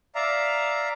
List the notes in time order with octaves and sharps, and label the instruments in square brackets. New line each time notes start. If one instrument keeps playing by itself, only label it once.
[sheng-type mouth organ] D5 E5 F5 A#5